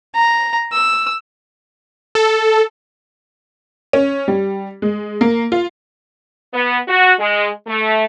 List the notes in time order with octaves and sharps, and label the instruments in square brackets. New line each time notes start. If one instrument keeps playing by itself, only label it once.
[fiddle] A#5
E6
[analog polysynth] A4
[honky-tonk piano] C#4
G3
G#3
A#3
F4
[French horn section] B3
F#4
G#3
A3